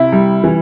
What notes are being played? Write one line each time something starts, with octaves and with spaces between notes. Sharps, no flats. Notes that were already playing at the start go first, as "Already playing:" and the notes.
Already playing: C3 E4
G3
E3